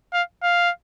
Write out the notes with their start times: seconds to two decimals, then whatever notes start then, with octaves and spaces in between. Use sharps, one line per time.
0.13 F5
0.43 F5